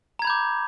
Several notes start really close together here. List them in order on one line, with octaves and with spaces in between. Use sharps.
A#5 G#6 B5 G6 D6